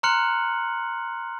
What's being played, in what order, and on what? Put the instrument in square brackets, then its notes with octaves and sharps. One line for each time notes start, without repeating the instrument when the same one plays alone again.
[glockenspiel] A#5 C6 F6 F#6 C#7 F#7